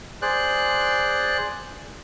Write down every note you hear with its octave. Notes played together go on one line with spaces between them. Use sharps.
G#4 C5 D5 F#6